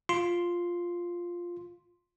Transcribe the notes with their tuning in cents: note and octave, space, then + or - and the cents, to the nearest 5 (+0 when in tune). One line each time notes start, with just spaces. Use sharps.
F4 +0 C6 +0